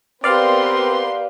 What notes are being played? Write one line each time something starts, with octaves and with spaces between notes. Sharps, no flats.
B3 C4 G4 A#4 B4 D5 F5 C6